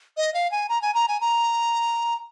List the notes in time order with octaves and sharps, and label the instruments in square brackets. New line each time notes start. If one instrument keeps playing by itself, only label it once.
[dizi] D#5
F5
G#5
A#5
G#5
A#5
G#5
A#5